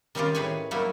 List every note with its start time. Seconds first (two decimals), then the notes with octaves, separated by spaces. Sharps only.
0.15 D#3 G3 C4 C#4 F4 G4
0.35 A2 D#4 G#4 B4 C#5 G#5
0.71 F#3 G3 A#3 D#4 E4